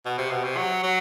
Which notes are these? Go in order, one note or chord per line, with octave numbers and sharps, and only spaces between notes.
B2
C3
B2
C3
F#3
F#3